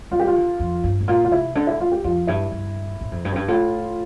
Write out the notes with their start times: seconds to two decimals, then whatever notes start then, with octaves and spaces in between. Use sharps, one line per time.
0.11 G3 F4
0.19 G4
0.27 F4
0.35 D3
0.59 F2
0.83 G2
1.01 A2
1.08 A#2 F4
1.25 F4
1.31 C3 E4
1.55 D3 D4
1.67 E4
1.80 F4
1.92 G4
2.04 F2 F4
2.27 G2 E4
2.52 G2
3.01 A2
3.12 F2
3.25 G2
3.32 F2
3.36 G2
3.48 A2 F4